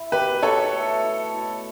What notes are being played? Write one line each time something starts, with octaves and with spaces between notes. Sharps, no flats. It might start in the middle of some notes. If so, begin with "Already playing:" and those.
Already playing: E4
B2 G4 B4
B2 A4 C#5
A3
E4
B2